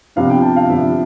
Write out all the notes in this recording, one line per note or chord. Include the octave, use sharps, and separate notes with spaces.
C3 F3 B3 D4 F5
G5
A5
F5
C3 F3 B3 D4 E5